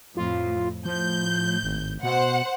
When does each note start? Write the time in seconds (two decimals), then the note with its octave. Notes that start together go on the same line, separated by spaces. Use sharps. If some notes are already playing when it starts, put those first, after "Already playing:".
0.17 F2 A2 F4
0.85 A2 F3 G6
1.63 G#1
2.03 B2 C5 F#5